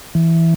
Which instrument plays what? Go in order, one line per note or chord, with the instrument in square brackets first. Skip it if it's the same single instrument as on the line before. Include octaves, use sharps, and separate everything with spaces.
[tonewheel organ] E3